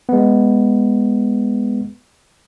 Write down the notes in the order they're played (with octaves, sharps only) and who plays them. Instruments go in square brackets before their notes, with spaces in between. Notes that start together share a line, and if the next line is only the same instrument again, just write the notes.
[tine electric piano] G#3 B3